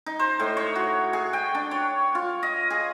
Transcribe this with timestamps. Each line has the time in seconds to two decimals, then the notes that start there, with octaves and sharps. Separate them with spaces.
0.06 D#4
0.19 C5
0.40 A2
0.57 C#5
0.75 F#4
1.13 G#4
1.33 G5
1.55 D4
1.71 C#5
2.15 F4
2.43 D#5
2.70 G#4